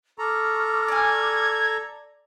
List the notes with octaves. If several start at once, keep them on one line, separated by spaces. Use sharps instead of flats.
A4 A#5 C#6 D6 F6
D5 G#5 G#6